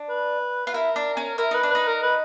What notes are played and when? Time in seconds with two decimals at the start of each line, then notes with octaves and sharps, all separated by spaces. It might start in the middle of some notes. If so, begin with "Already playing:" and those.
Already playing: D4
0.10 B4
0.66 F4 B4
0.74 E4 A#4
0.96 D4
1.17 C#4
1.38 E4 A#4
1.51 D#4 B4
1.63 D4
1.70 D#4 B4
1.87 A#4
2.03 B4